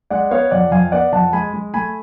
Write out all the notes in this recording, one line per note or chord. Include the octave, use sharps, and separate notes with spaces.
G#3 D5 F#5
B3 C#5 F5
F2 D5 F#5
F2 F5 G#5
B3 D5 F#5
F2 F#5 A5
G#3 G#5 B5
G#3
A3 G#5 B5